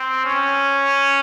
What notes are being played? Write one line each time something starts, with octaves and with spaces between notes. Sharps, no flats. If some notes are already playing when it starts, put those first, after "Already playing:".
Already playing: C4
C#4